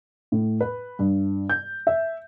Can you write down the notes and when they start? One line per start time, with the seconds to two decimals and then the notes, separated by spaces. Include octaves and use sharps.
0.32 A2
0.61 B4
0.99 G2
1.49 G6
1.87 E5